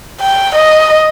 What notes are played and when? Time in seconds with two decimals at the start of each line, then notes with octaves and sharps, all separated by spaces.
0.21 G5
0.55 D#5